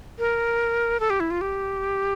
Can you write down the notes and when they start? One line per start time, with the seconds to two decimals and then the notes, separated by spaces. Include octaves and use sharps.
0.19 A#4
1.00 A4
1.10 G4
1.20 E4
1.31 F4
1.41 G4